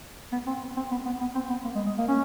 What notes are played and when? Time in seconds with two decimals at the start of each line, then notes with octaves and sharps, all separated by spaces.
0.32 B3
0.47 C4
0.76 C4
0.91 B3
1.05 B3
1.21 B3
1.35 C4
1.50 B3
1.65 A#3
1.75 G#3
1.86 G#3
1.98 A#3
2.08 C#4